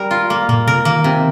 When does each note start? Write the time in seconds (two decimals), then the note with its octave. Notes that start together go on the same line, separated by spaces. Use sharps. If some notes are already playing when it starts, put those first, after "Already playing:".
Already playing: G3 A#4
0.11 F4
0.30 A#3
0.49 A#2 A#3
0.67 C3 A#4
0.85 D#3 A#3
1.04 C3